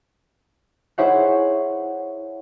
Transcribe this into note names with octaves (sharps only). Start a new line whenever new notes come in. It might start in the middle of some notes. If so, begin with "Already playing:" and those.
E4 G#4 C5 C#5 E5 F#5